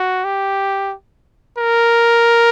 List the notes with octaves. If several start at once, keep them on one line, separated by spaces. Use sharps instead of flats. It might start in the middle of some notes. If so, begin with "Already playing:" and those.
Already playing: F#4
G4
A#4